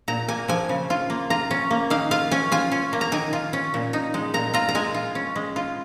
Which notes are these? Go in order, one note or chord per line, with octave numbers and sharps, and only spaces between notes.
A#2 A#5
A#3 G#5
F3 G#5
C#3
F4
A#3
F4 A#5
C#4
A#3
D#3 F5
F4 F5
C#4 G#5
F4 G#5
C#4
A#3
A#5
D#3 G#5
F4
C#4
A#2
D#4
G#3
A#2 A#5
F4 A#5
A#5
G#3 G#5
F4
C#4
G#3
F4